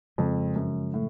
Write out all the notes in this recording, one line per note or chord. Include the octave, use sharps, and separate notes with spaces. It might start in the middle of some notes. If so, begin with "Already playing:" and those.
F2 C#3 F3 G#3
F#2
A2